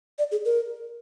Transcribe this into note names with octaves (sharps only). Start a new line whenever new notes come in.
D5
G#4
A#4